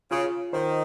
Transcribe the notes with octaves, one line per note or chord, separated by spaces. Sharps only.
C#3 F4
D#3 C5